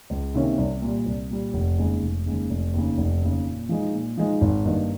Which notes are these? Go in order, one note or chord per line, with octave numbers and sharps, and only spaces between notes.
C#2
C3 D#3 A#3 C#4
C2
A#2 G3
C2
A#2 G3
F1
D#2 C#3 G#3
F1
D#2 C#3 G#3
F1
D#2 C#3
F1
D#2 C#3
A#2
F3 G#3 D#4
A#2
F3 G#3 D#4
G#1
G2 D#3 A#3 D#4